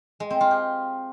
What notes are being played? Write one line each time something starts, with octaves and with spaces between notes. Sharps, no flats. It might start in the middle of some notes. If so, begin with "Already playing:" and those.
G#3
C4
F4
G4